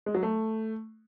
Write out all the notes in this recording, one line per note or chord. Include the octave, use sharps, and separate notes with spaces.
G#3
F#3
A3